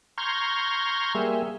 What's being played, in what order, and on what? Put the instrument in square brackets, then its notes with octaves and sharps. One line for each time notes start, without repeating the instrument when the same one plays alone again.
[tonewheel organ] A#5 C6 C#6 F6 G6 G#6
G3 A#3 G#4 E5